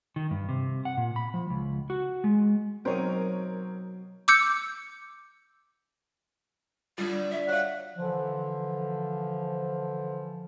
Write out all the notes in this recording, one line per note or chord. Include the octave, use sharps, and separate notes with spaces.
D#3
G2
C3
F#5
A#2
B5
F3
C#2
F#4
G#3
B2 F#3 C4 D#4 A#4 C#5
D6 E6 G6 C#7
A2 D3 G3 D4 F4
D5 E5
F#4 C#5 F5 F#5
D3 E3 F3